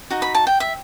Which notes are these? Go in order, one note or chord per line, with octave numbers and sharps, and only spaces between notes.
D#4 F#4
B5
A5
G5
E5